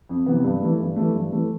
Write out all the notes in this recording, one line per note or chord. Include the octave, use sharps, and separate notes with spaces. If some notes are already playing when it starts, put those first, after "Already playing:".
F2
C3 E3 B3
G2
E3 A3
G2
E3 A3
G2
E3 A3